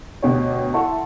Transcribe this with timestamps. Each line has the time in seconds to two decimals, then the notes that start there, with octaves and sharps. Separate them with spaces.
0.22 D2 B2 G4 C#5
0.74 E4 A4 E5 F#5 C6 C#6